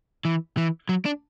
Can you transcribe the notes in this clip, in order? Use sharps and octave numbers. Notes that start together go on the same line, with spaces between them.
E3
E3
F#3
D4